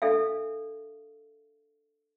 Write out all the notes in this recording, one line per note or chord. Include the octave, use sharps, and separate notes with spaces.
D4 A4 E5 F5